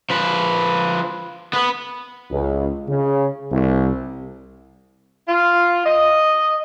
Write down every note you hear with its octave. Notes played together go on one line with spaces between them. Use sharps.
F3 B4
B3 B4
C#2
C#3
C2
F4
D#5